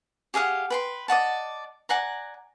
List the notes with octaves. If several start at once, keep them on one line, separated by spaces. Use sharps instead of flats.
G4 G#4 F5 F#5
B4 G5 C6
D5 D#5 F#5 A5
D5 F#5 G#5 A#5